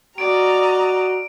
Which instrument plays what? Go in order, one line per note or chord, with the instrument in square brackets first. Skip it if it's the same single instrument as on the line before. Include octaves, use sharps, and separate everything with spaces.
[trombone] F#4 [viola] D5 [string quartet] D#5 A#5 F6 [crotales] D7